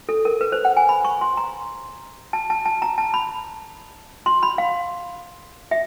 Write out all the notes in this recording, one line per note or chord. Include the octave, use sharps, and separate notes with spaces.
A4
A#4
B4
C5
F#5
G#5
B5
C#6
C6
A#5
A5
A5
A5
A#5
A5
B5
C6
B5
F5
E5